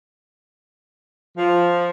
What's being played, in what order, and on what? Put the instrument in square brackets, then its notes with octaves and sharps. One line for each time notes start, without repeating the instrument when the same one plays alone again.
[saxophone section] F3